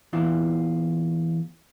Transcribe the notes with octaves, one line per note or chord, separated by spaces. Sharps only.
E2 A#2 E3 F4